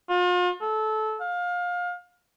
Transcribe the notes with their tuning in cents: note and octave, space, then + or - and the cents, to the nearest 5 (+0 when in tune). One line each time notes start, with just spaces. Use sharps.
F4 +40
A4 -20
F5 +25